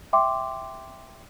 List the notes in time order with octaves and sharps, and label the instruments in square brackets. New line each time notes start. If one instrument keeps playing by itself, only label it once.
[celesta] E5 G5 C6 D6